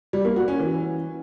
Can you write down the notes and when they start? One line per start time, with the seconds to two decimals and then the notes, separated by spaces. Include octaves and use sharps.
0.13 G3
0.25 A#3
0.36 F#4
0.48 C#4
0.59 E3